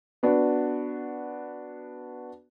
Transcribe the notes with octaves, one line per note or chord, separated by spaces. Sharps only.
B3 D4 F#4